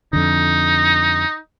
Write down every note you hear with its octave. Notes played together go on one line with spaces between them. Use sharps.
F2 D3 D#4